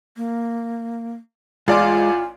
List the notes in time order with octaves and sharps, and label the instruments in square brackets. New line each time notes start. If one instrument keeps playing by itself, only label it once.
[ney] A#3
[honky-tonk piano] A1 D5 D6 [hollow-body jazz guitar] G#3 [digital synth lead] F4 [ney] G#5